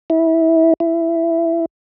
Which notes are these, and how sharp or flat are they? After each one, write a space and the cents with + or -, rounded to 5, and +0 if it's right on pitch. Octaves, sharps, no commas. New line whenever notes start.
E4 -20
E4 +15